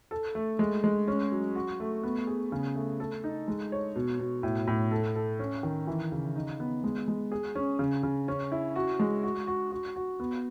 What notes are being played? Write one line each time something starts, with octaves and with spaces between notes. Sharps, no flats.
A4
A3
G#3
G#3
C#4
F#3
F#4
A3
B3
G#4
C#3
A3
A4
D#4
G#3
C#5
B2
B2
A2
A2
A4
A4
C#4
D#3
E3
C#3
D#4
B3
G#3
G#3
G#4
C#4
C#3
C#3
C#4
E4
F#4
G#3
F#4
F#4
F#4
F#4
B3